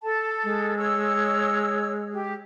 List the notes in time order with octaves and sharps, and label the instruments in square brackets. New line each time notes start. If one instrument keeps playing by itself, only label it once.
[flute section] A4 [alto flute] A5
[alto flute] G#3
[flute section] C#5 E6
G4